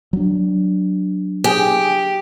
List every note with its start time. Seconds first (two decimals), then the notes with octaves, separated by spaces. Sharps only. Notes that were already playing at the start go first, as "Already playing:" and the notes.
0.13 F#3 D4
1.44 G4 G#4 G5